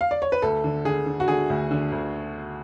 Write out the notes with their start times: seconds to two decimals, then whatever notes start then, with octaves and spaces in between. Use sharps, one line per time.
0.01 F5
0.11 D5
0.22 C#5
0.32 B4
0.42 D2 A4
0.64 D3
0.85 D3 G#4
1.06 D3
1.20 F#4
1.28 D3 G#4
1.50 D2
1.71 D3
1.92 D2